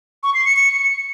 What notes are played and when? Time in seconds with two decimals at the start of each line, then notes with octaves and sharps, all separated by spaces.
0.23 C#6
0.34 C7
0.45 C#7
0.56 C#7